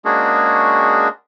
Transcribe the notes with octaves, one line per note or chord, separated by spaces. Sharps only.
G#3 A#3 C#4 D4 F#4 G#4